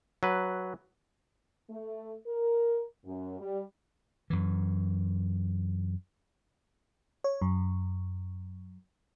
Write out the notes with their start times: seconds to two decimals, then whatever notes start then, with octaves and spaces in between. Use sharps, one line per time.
0.23 F#3 B4
1.69 A3
2.26 A#4
3.04 F#2
3.39 G3
4.30 F#2 E3
7.24 C#5
7.42 F#2